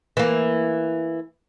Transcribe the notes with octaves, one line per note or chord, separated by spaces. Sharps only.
E3 A#3